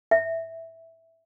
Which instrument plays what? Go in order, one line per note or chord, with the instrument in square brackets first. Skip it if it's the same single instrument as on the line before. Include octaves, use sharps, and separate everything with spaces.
[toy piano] E5